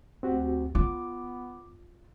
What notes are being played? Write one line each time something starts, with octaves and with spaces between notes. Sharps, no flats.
D2 C4 F#4 G4
B3 F4 D6